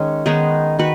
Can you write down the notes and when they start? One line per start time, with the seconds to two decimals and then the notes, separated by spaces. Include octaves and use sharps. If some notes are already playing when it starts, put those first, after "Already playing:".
Already playing: D#3 G#3 C#4
0.26 D#3 G#3 B3 D#4 G#4
0.79 D#3 F#4 B4